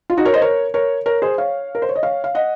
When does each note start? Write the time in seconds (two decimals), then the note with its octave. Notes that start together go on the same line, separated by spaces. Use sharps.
0.10 F4
0.17 D#4 F#4
0.25 A#4 C#5
0.34 C5 D#5
0.42 A#4 C#5
0.74 A#4 C#5
1.06 A#4 C#5
1.22 G#4 C5
1.38 C#5 F5
1.75 A#4
1.82 C5
1.89 C#5
1.96 D#5
2.03 C#5 F5
2.24 F5
2.35 D#5 F#5